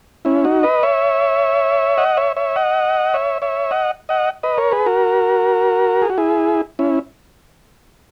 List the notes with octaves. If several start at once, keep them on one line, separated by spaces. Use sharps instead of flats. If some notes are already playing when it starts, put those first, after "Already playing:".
C#4 E4
D#4 F#4
B4 D#5
C#5 E5
D#5 F#5
C#5 E5
C#5 E5
D#5 F#5
C#5 E5
C#5 E5
D#5 F#5
D#5 F#5
B4 D#5
A#4 C#5
G#4 B4
F#4 A#4
G#4
F#4
E4 G#4
C#4 E4